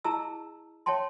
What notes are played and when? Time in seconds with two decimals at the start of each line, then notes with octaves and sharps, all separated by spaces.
0.04 E4 G#4 D#5 A5 A#5 E6
0.86 C#5 E5 G5 A5 C6